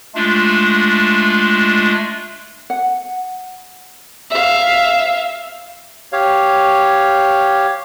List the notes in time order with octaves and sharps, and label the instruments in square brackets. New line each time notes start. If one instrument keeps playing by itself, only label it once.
[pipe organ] G#3 A3 D4 F4
[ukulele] F#5
[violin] E5 F5
[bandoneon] G4 C#5 F5